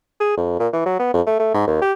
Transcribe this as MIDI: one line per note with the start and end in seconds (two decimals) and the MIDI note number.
0.20 0.34 68
0.37 0.58 41
0.59 0.68 46
0.73 0.82 52
0.86 0.99 54
0.99 1.09 59
1.14 1.22 41
1.26 1.37 57
1.39 1.54 57
1.54 1.64 44
1.67 1.80 39
1.82 1.93 67